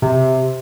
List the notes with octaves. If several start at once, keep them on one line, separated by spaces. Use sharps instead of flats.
C3